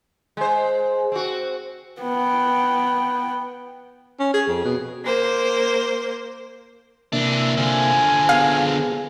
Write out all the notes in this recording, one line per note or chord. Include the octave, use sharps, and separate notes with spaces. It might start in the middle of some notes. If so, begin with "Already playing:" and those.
G#3 C5
C4 F#4
B3 G5
C#4
G#4
F2
B2
A#3 C5
C3 E3 A#3 D4 E5
D3 F3 G#5
B3 G#4 F5